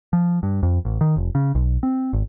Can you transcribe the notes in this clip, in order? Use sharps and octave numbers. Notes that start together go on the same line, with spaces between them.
F3
G2
F2
A1
D#3
F1
C#3
B1
C4
G#1